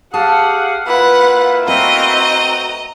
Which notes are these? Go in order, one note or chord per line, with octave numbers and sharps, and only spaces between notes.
G4 G#4 F5 F#5 A5
A#3 E4 F4 B4 F#5
A3 B3 C4 F#4 D#5 A#5